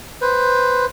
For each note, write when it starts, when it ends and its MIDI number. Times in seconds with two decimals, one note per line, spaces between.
0.21 0.86 71
0.21 0.86 72